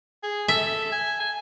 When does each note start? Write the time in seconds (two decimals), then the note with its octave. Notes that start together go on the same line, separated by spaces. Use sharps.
0.23 G#4
0.48 A4 E5
0.92 G#5
1.20 G#5